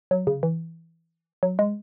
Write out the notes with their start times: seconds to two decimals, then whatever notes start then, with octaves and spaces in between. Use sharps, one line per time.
0.11 F#3
0.27 C#3
0.43 E3
1.43 F#3
1.59 G#3